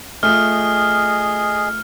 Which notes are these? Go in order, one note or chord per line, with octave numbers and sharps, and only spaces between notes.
A3 F4 G#4 D#5 F6